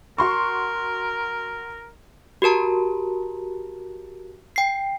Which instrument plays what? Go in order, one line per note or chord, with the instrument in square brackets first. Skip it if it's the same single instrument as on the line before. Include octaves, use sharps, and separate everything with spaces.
[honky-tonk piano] F#4 C6 C#6 [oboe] A#4
[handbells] F#4 G4 A#4 A5 A#5
G5 C7